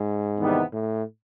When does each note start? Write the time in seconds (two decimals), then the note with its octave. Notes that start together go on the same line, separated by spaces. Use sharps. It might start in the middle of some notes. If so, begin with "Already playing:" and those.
Already playing: G#2
0.38 E2 C3 D#3 G3 B3
0.73 A2